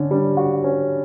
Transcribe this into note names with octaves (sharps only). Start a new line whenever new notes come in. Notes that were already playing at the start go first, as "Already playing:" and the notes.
Already playing: D3 C#4
G3
F#4
C#4